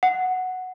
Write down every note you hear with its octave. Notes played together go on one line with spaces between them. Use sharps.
F#5